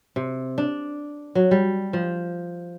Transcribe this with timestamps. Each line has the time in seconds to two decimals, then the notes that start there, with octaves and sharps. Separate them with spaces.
0.16 C3
0.58 D4
1.35 F#3
1.51 G3
1.93 F3